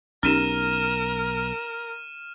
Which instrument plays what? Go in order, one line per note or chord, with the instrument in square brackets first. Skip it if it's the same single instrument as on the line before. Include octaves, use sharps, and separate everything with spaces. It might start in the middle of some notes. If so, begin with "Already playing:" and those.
[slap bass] B1 [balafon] C#4 D#4 G4 [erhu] A#4 [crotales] F6 D#7 E7